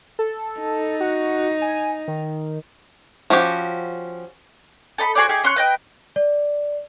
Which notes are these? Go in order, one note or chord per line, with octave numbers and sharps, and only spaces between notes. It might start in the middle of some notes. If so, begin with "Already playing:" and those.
A4
D#4
F#4
G#5
D#3
F3 C#4 F#4 G4
A4 D#5 A#5 B5
F#4 G#4 C5 D5
D#4 G4 G#4
C#4 C6 C#6 F#6
B4 D#5 G5
D5